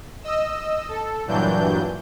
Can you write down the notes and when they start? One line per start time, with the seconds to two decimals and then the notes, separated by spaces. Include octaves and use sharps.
0.23 D#5 E6
0.89 A4
1.27 G2 A#2 E3 F#3 D4 G6